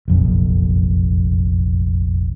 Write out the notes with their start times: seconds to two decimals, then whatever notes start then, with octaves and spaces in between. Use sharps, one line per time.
0.08 F1 A#1 F#2